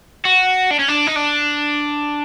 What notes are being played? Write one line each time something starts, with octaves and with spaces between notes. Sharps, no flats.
F#4
D4
C#4
D4
D#4
D4